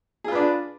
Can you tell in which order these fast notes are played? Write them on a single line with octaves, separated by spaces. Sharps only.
G#4 F4 B4 D4